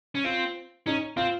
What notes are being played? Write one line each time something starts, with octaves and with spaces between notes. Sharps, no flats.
C#4
C4 F4
C#4 D#4
C4 F4